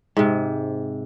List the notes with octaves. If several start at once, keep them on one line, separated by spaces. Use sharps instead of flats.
G#2 C3